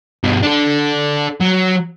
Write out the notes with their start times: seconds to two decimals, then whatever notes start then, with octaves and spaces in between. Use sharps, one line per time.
0.23 G2 B2
0.42 D4 A4
1.41 F#3